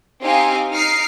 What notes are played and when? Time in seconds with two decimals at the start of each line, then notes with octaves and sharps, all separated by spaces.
0.24 C4 D#4 G4 F5 G#5
0.73 D#4 F6 C7 D7